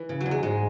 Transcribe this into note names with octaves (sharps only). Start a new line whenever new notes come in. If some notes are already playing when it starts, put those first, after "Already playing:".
Already playing: E3
C#3
F#3
E2
G#3
G#2 G#3